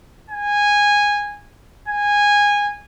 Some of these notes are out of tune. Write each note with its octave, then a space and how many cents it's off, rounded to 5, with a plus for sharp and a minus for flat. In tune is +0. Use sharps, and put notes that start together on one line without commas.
G#5 -15
G#5 -15